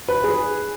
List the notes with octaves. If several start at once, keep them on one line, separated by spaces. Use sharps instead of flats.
B4
G#4